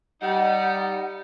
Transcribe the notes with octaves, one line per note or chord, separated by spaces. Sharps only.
G3 D#4 F#5